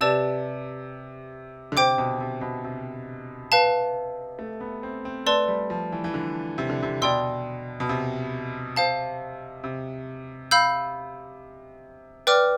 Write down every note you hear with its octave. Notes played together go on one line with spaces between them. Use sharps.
C3 G4 B4 D5 A5 E6
D3
C3 C5 G5 D6
B2
C3
B2
C3
B4 F5 A5
A3
B3
C4
C4
A3 B4 D5 A5 C6 E6
G3
F3
E3
E3
D3
C3
D3
C3
B2 D5 G5 C6 E6
B2
C3
C5 F5 A5
C3
F5 B5 E6 G6
B4 D5 G5 D6 F6